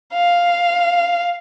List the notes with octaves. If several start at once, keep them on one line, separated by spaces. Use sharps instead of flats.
F5